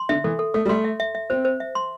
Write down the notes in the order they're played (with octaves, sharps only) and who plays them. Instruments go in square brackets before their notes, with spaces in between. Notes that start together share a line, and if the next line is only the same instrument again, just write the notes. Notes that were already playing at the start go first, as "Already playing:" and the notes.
Already playing: [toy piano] C6
[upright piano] D3 [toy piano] E5
[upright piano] E3 [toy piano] A4
[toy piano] A4
[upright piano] A3 [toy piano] A4
[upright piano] G3
[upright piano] A3 [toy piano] C6
[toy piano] E5
E5
E5
[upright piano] C4 [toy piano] C5
[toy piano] C5
E5
C6